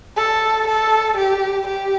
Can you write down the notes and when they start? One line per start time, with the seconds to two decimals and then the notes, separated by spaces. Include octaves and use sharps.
0.17 A4
0.67 A4
1.17 G4
1.68 G4